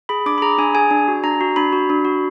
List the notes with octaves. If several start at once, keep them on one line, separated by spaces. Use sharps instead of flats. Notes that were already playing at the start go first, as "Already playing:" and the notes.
G#4 B5
D4 D6
B5
G#4 A#5
D4 G#5
G#4 G#5
D4
F#4
D4 A#5
F#4
D4 B5
F#4
D4
F#4